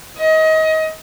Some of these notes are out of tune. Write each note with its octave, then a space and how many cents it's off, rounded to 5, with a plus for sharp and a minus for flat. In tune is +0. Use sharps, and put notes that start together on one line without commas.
D#5 +25